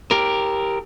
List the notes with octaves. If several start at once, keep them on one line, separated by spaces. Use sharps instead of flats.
G4 A#4